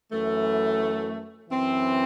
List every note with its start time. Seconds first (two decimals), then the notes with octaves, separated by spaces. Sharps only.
0.12 F#2 E3 A3
1.49 F#2 E3 C4